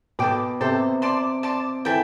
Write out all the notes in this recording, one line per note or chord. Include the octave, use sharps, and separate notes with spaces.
B2 A4 C5 G5 D6
C3 A4 C5 G5 D6
D5 A5 C6
D5 A5 C6
E3 A4 E5 G5